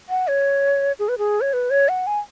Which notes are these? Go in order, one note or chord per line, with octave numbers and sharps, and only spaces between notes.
F#5
C#5
G#4
B4
G#4
C#5
B4
C#5
F#5
G#5